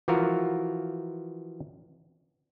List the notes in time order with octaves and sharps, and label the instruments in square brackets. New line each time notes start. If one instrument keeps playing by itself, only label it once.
[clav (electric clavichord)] E3 F3 F4 F#4 A#4